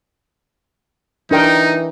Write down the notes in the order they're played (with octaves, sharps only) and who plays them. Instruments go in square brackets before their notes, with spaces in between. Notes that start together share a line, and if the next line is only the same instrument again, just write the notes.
[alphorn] E3 [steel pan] D4 A#4 G5 [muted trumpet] D#4